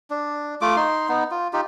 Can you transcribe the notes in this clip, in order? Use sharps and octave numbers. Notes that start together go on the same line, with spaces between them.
D4
A3 F4 D6
D#4 C6
B3 D#4
F4
D#4 F4 G4